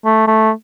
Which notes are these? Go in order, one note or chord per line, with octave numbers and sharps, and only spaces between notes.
A3
A3